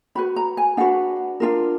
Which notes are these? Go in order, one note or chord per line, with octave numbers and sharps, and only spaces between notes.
D4 F#4 B4 B5
A#5
G#5
D4 F#4 B4 F#5
D4 F4 A#4